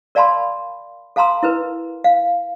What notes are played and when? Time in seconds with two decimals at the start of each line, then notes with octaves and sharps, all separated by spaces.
0.15 A#4 D5 F5 A5 B5 C6
1.16 A4 F5 A5 A#5 C6 E6
1.43 E4 A#4 B4
2.04 F5